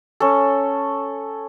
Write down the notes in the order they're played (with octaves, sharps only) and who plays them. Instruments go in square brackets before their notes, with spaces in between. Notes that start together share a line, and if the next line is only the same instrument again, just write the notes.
[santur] C#4 A4